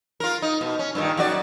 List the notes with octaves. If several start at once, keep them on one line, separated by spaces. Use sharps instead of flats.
F4 A#4
D#4
B2
C#4
G2 A#2 D#3
F#2 F#4 D5